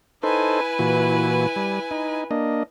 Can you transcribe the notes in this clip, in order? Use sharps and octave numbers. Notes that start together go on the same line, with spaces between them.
D#4 E4 A4 B4 C5 G#5
A#2 E3 F#4
G3
D#4
A#3 D4 D#5